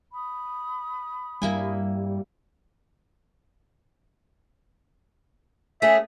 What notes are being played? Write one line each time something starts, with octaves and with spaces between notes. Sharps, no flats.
B5 D#6
G2 G3 A#3 E4 G#5
A3 C#4 G#4 E5